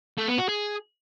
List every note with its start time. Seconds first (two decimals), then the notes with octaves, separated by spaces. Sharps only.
0.18 A3
0.28 B3
0.38 F#4
0.49 G#4